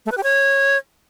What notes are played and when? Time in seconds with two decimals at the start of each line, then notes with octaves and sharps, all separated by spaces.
0.06 A3
0.12 B4
0.17 G4
0.23 C#5